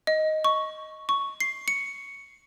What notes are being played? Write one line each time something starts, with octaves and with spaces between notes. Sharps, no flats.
D#5
C#6
C#6
C7
C#7